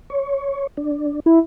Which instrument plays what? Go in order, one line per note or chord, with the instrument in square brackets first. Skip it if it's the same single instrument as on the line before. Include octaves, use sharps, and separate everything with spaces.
[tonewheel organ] C#5
D4
[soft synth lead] E4